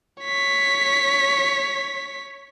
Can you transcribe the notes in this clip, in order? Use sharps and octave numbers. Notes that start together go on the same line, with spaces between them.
C#5 B6